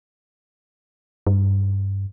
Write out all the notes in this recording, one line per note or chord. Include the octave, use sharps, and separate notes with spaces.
G2